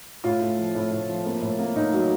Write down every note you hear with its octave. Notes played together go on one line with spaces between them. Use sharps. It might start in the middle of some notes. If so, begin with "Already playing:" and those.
A2 F4
A2
F3
A2
A2
F3
A#3
A2
A#3
A2 D#4
F#3